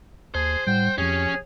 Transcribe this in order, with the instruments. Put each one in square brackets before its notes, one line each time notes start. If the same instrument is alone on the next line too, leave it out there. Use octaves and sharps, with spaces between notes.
[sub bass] D#2 [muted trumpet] G#4 [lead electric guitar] C5 [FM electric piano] A5
[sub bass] A2 [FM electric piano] G3 F#5 [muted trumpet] G5
[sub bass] F2 [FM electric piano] F3 G4 [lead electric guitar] C#4 [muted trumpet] G#4